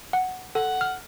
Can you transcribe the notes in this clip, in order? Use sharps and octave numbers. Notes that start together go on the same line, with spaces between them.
F#5
A4 F#5
F6